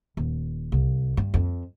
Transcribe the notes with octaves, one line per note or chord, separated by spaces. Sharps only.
D#1
C2
G2
F2